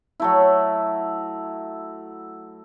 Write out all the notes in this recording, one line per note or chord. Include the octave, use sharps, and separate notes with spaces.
F#3 A3 E4